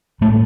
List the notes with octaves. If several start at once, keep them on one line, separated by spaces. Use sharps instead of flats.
A2 A3